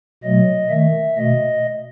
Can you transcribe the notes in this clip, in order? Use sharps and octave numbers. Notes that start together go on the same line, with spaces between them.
B2 F#3 A3 D#5
D#3 A3 E5
B2 A3 D#5